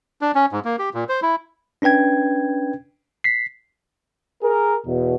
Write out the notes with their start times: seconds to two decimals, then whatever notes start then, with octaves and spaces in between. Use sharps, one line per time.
0.21 D4
0.35 C#4
0.52 G#2
0.65 A#3
0.79 G4
0.94 A#2
1.09 C5
1.22 E4
1.82 C#4 D4 B4 G5 G#6
3.24 B6 C7
4.43 G#4 A#4
4.85 E2 B2